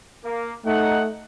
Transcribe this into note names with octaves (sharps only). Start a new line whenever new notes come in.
A#3
A3 D#4 F#5